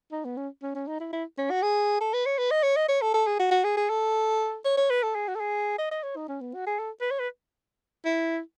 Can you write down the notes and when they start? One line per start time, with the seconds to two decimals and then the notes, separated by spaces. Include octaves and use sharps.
0.12 D#4
0.25 B3
0.37 C#4
0.62 C#4
0.75 C#4
0.87 D#4
1.00 E4
1.13 E4
1.38 C#4
1.51 F#4
1.63 G#4
2.01 A4
2.14 B4
2.26 C#5
2.38 B4
2.51 D#5
2.63 C#5
2.76 D#5
2.89 C#5
3.02 A4
3.14 A4
3.27 G#4
3.39 F#4
3.51 F#4
3.64 G#4
3.77 G#4
3.90 A4
4.65 C#5
4.78 C#5
4.90 B4
5.03 A4
5.15 G#4
5.28 F#4
5.35 A4
5.40 G#4
5.78 D#5
5.91 D#5
6.03 C#5
6.16 D#4
6.29 C#4
6.41 B3
6.54 F#4
6.67 G#4
6.79 A4
7.01 B4
7.11 C#5
7.20 B4
8.05 E4